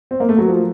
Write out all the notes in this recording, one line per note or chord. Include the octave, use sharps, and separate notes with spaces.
C4
A#3
A3
F#3
F3